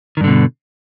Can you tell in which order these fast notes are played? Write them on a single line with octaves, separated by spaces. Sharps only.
D#3 G2 D3 B2